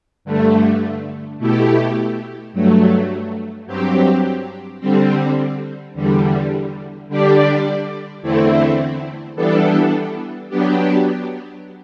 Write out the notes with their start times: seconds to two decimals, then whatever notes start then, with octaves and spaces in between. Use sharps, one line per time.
0.25 G2 D3 A3
1.39 B2 A3 E4 G4
2.53 G2 F#3 A3
3.67 G2 F#3 C4 G4
4.80 D3 G3 C4
5.94 E2 D3 G3
7.09 D3 G3 D4 G4 D5
8.22 E2 D3 A3 C4 E4
9.36 E3 G3 B3 D4 A4
10.50 F#3 B3 D4 G4